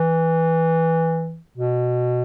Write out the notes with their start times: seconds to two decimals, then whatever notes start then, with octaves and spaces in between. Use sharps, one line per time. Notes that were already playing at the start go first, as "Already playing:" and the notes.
Already playing: E3
1.58 B2